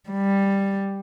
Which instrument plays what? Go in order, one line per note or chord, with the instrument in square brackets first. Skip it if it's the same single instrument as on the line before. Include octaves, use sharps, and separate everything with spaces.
[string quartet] G3